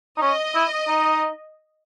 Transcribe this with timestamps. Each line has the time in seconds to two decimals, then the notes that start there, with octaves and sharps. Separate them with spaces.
0.17 D#4
0.22 C#4 D#5
0.55 E4
0.88 D#4